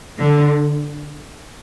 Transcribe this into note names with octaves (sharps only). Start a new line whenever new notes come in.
D3